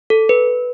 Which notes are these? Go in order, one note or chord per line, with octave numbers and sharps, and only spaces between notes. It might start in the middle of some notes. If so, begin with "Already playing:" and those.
A4
B4